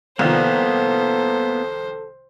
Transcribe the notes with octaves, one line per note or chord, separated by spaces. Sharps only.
C2 D#3 F3 A#3 B3 A4 C5